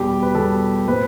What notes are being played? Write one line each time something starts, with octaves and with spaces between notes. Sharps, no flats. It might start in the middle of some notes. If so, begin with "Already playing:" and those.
Already playing: E2 B2 G3 G4
B4
E2 B2 G3 A4
A2 G3 C4 B4